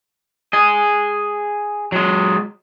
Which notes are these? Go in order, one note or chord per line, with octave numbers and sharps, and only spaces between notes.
G#4 D#5
F#3 G#3